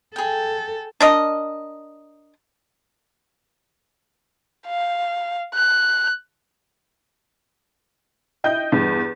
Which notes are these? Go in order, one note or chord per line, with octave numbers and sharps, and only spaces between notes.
G#4 A4 G5
D4 A#4 D#5
F5
F#6
E4 D#5 G5 G6
E2 G2